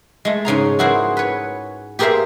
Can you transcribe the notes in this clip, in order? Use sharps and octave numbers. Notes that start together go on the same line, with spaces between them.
G#3 A3
G#2 C#3 G#4 A#5
E4 F#4 G#4 A#4 C5
B4 C#5
G4 G#4 A#4 C5 E5 F5